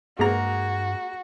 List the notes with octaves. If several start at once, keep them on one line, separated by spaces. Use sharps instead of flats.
G2 G#3 A#3 F#4 A#5